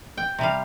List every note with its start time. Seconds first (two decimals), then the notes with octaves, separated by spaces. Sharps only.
0.17 G5
0.38 C3 G3 F5